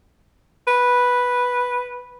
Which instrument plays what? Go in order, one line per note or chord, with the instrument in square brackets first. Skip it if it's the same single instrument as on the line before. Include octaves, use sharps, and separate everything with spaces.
[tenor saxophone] B4